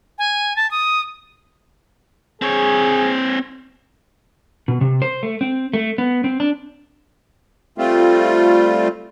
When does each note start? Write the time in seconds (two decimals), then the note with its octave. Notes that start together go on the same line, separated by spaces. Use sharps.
0.18 G#5
0.56 A5
0.71 D#6
2.42 C4 G#4 C#5
4.68 B2
4.81 C3
5.02 C5
5.23 A3
5.41 C4
5.73 A3
5.98 B3
6.24 C4
6.40 D4
7.78 G3 A3 C4 F4